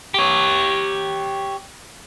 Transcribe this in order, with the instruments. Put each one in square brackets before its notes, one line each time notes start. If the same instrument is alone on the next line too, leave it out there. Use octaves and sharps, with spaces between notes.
[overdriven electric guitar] G4 C#5